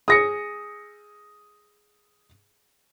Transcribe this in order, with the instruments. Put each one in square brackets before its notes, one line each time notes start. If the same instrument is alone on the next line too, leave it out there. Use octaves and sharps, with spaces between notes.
[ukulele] G#4 [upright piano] D#6 A#6 C#7